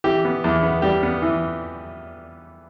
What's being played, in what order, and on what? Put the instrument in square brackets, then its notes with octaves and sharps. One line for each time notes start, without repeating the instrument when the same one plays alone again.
[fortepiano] E3 G4
B3
E2
B3
G3 G4
B3
E3